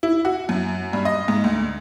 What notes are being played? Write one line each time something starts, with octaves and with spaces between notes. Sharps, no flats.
E4
F#4
F#2
G2
D#5
G#2
D2